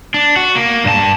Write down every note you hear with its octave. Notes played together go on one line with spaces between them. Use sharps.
D4
F#4
A#3
G2 A5